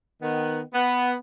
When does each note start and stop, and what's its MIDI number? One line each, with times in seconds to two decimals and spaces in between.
0.22 0.61 51
0.22 0.61 59
0.74 1.14 59